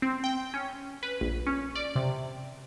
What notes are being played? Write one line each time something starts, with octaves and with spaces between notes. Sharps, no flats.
C4
G5
C#4
B4
A#1
C#4
D5
C3